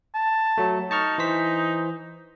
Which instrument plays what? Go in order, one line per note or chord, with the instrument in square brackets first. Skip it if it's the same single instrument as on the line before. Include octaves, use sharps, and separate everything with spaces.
[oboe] A5
[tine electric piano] F#3 A3
[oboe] D#4 [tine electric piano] A5 C#6 F6
[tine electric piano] E3 C5 B6